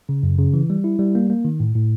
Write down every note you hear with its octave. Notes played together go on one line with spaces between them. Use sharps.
C#3
F#2
C#3
E3
G3
E4
G3
A#3
A#3
D#3
A2
A2